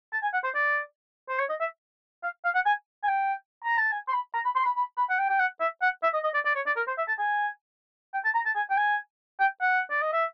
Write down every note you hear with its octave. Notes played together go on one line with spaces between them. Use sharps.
A5
G#5
F#5
C5
D5
C5
C#5
D#5
E5
F5
F5
F#5
G#5
G#5
G5
A#5
A5
G#5
C6
B5
A#5
B5
C6
B5
B5
B5
F#5
G5
G5
F#5
E5
F#5
E5
D#5
D#5
D5
D5
C#5
D5
A#4
C5
E5
A5
G#5
G5
A5
A#5
A5
G#5
G5
G#5
G5
F#5
D5
D#5
E5